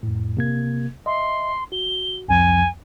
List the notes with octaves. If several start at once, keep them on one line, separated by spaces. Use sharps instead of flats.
F2 A2
C3 A#3 G#6
D#5 E5 C6
F#4 G7
C2 F2 F3 G#5